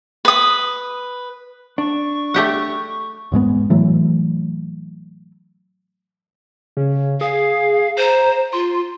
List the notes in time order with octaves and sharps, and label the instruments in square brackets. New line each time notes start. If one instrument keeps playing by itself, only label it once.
[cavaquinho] B4 D#6
[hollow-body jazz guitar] D4 [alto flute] C#6
[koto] A3 G4 F#5
[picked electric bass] E1 G#2 G#3 B3
A2 E3 F#3 A3
[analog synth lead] C#3
[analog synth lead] G#4 [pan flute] F5
[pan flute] C5 [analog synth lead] A#5
[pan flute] F4 [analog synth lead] C6